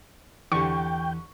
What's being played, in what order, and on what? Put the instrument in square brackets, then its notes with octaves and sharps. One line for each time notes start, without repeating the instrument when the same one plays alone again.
[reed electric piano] E2 E3 [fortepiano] D3 G4 [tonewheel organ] G5 [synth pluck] C#6